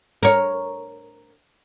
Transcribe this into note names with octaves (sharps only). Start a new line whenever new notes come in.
A#4 C#5